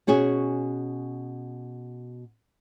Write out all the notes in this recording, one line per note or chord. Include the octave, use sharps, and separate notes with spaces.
B2 C#4 F#4 G#4